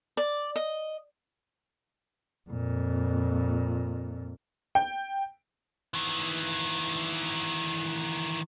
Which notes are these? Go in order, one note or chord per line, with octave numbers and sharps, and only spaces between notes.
D5
D#5
F2 A#2
G5
D#3 E3